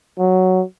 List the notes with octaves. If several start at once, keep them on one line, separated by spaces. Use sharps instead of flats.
F#3